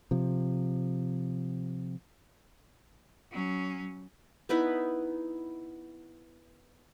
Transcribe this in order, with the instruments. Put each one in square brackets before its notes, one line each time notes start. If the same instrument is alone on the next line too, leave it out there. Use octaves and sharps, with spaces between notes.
[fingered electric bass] C3 F3
[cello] F#3 C#4
[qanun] B3 D#4 E4 B4